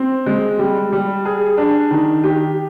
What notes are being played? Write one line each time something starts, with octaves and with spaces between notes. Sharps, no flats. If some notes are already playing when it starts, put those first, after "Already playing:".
Already playing: C4
G#3
G3
G3
G#4
D4
D#3
G4